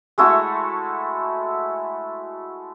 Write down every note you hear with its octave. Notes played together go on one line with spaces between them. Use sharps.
G#3 A3 E4 F#4